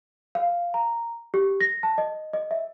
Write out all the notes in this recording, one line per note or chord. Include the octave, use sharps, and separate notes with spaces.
F5
A#5
G4
A#6
A5
D#5
D#5
E5